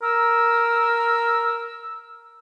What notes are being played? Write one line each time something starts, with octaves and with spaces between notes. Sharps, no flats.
A#4 E6